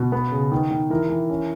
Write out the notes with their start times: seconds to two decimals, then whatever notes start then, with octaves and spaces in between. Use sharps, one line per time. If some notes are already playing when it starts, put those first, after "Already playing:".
Already playing: B2
0.12 B3
0.32 C#3
0.52 D#3
0.71 D#3
0.90 E3 A#4
1.10 E3
1.30 C#4